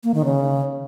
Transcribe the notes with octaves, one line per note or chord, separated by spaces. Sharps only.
A#3
D#3
C#3